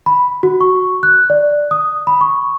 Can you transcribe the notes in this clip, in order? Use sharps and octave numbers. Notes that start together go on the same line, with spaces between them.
B5
F#4
C#6
F#6
D5
D#6
B5
C#6